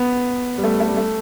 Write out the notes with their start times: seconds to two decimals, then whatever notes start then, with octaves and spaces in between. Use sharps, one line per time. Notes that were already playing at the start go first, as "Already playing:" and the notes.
Already playing: B3
0.58 G3
0.64 A3
0.80 A3
0.88 G3
0.97 A3